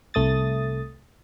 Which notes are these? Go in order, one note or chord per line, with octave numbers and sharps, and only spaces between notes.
C2 A3 D#6 A6